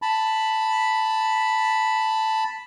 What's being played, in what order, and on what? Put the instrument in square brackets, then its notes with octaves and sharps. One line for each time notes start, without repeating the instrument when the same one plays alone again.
[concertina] A5 B5